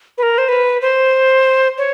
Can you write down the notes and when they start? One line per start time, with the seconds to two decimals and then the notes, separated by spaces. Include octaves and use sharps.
0.18 B4
0.23 A#4
0.38 C5
0.49 B4
0.81 C5
1.78 C#5